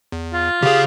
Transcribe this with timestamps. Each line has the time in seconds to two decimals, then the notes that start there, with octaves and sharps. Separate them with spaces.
0.12 E2
0.33 F4
0.62 C#3 G4 G#4 F5